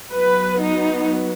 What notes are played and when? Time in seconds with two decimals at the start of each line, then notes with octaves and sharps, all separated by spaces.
0.12 F#3 B3 B4
0.61 D#4